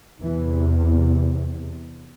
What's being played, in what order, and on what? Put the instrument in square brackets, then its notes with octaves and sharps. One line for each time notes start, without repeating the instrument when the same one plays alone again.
[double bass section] E2 C3 E3